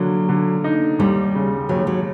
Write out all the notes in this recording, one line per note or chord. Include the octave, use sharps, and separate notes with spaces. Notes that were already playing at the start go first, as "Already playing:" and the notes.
Already playing: D3 F#3 A#3
D3
D#4
D#2 G3
C#3
D#2 F#3
F#3